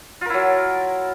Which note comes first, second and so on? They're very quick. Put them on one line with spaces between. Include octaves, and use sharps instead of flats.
F4 A#4 E4 F#3